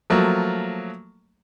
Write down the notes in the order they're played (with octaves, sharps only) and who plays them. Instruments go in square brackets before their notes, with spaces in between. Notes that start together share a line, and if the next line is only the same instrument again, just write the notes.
[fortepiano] F3 F#3 A3 A#3